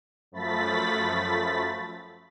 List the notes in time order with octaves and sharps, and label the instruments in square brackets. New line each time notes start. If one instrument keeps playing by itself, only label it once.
[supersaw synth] F#2 F3 A3 B5 A6 B6